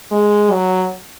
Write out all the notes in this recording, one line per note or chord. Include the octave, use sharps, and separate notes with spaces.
G#3
F#3